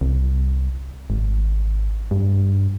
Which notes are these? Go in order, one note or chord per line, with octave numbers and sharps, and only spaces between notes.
C2
G#1
G2